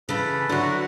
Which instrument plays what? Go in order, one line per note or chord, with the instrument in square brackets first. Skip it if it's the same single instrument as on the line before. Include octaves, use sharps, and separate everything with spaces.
[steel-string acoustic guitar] C#3 E3 [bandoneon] A4 B4
[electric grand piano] D3 [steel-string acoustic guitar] F#3 E4 [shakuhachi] F#4